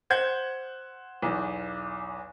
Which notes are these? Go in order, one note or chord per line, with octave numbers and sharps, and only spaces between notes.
C5 F#5 G6 G#6
B1 E2